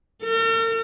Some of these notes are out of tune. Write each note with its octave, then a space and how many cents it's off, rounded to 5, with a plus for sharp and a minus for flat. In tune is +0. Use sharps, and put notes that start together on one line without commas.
A#4 -45